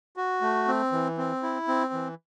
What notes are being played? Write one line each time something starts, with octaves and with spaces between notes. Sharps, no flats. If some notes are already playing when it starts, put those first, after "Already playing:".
F#4
A3
C4
E3
C4
E4
C4
E3